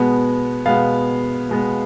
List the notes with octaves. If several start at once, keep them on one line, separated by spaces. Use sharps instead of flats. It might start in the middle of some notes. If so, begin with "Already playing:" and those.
Already playing: B2 G#3 B3
B2 G#3 B3 F5
B2 G#3 B3